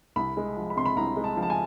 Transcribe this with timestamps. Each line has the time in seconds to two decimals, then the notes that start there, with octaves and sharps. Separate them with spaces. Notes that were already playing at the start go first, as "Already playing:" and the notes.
0.16 C2 B5
0.37 G#3
0.57 F3
0.70 B5
0.77 C3 C6
0.86 B5
0.96 C2 A#5
1.16 G#3
1.24 A5
1.37 F3
1.43 A5
1.50 G#5